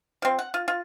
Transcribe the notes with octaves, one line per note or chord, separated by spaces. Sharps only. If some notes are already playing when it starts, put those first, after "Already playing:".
F3 C4
F#5
F4
F4